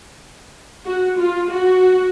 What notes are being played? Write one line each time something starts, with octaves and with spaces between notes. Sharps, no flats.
F#4
F4
F#4